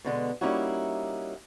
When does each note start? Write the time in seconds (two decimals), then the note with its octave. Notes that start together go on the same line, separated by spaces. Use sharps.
0.04 B2 D3 G#3
0.41 G3 A#3 C#4 D#4 E4 F#4